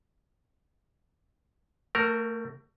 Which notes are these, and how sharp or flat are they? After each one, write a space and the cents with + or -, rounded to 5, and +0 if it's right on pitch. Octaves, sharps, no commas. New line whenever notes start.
A3 +30 F#4 +0 A#4 +0